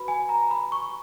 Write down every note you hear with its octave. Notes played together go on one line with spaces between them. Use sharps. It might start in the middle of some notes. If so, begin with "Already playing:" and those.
Already playing: F#4 B4 B5
G#5
A#5
B5
C#6